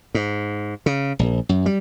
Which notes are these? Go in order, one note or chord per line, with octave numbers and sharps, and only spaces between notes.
G#2
C#3
A#1
F#2
G3